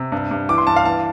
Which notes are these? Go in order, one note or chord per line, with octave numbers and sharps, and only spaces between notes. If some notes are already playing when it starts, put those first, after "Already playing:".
Already playing: C3
G2
G2
E3 D6
C6
G2 A5
F5
E3 A5